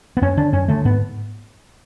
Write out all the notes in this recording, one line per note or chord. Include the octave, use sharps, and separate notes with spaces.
B3
F#2 C#4
D3 D4
F#2 C#4
D3 A3
G#2 B3